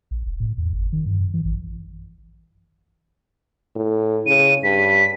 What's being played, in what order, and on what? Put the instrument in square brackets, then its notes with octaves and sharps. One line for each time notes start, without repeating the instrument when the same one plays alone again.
[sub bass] A#1
E1
A2
E2
G1
D#3
G2
F#2
E3
A1
[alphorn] A2
[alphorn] C#3 [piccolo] D#7
[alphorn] G2 [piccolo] B6